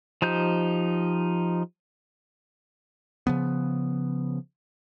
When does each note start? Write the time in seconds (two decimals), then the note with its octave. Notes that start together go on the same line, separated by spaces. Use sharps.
0.22 F3 D#4 G4 G6
3.27 C#3 F3 B3